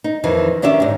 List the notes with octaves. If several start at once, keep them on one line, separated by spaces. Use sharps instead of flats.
D#4
F2 D#3 E3
D#3 C#4 D4 G4 E5
G#2 D#3